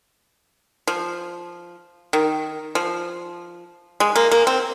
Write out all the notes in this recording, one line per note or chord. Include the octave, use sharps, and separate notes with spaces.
F3
D#3
F3
G#3
A#3
A#3
C4